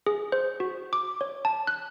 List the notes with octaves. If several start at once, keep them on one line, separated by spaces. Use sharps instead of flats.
G#4
C5
F#4
D6
C#5
A5
F#6